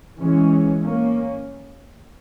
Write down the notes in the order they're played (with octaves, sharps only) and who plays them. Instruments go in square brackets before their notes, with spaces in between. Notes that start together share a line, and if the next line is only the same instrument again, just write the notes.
[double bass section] E3 G#3 C#4
A#3 C#4